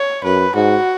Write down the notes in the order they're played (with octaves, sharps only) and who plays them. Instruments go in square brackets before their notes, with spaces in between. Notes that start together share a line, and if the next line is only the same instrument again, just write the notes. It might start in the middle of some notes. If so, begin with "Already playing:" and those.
Already playing: [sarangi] C#5
[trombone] F#2 [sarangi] B4
[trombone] G#2 [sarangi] F#4